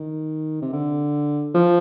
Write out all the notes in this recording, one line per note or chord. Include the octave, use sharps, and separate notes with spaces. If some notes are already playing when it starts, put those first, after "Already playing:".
Already playing: D#3
C3
D3
F3